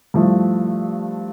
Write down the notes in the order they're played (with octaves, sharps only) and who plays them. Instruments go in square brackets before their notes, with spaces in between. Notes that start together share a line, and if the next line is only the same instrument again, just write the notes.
[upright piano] G2 F3 A3 E4